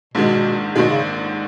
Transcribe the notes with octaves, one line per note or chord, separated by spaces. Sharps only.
A#1 G#2 B2 D#3 G#3
A#1 G#2 B2 D#3 G#3
C#3